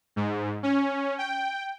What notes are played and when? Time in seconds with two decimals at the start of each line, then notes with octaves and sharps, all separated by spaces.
0.16 G#2
0.63 C#4
1.18 G5